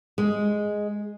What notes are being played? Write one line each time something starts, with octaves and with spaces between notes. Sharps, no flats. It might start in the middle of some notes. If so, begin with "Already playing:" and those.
G#3